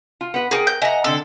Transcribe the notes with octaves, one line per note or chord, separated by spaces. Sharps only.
F4
B3 B4
G#4 A#4 F#5 G5
G6
D#5 E5 F#5 G#5 A#5
D3 C4 A4